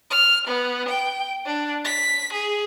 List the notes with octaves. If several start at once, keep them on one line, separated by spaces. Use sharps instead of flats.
F6
B3
G5
D4
B6
G#4